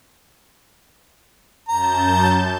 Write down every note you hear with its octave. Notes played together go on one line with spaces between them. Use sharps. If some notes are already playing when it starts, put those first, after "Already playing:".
F#2 A5 A#5 G6